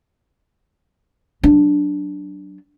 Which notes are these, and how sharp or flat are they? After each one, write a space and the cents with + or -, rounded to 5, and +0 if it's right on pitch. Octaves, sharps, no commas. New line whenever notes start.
F#3 +15 D4 +0